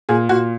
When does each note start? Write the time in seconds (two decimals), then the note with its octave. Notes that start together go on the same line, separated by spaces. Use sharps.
0.09 A#2 G#4
0.29 A#2 F#4